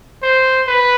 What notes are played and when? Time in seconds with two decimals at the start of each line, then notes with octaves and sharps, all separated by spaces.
0.23 C5
0.67 B4